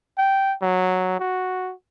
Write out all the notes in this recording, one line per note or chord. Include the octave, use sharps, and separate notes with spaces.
G5
F#3
F#4